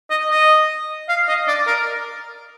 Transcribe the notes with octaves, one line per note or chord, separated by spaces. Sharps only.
D#5
D#5
F5
D#5
D5
A#4